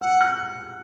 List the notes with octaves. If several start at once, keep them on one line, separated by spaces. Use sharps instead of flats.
F#5 E6
F#6